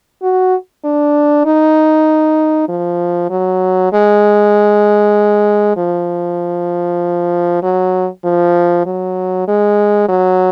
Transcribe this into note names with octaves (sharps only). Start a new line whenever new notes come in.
F#4
D4
D#4
F3
F#3
G#3
F3
F#3
F3
F#3
G#3
F#3